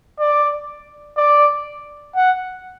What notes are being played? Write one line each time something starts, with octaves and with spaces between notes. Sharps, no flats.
D5
D5
F#5